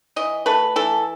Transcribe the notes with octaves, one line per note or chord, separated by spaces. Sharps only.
E3 D#5
A3 B4
E3 A4